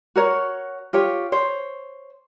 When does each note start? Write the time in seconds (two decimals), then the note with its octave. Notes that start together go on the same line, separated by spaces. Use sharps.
0.16 F#4 A#4 C#5
0.93 F4 G4 C#5
1.32 C5 C#5